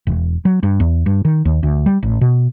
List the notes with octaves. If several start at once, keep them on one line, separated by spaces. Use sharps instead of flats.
E1
F#3
G2
E2
G2
D#3
D#2
D2
G3
A1
B2